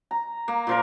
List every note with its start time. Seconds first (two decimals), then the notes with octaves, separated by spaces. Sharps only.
0.11 A#5
0.48 A#3
0.67 A#2 F3 A#4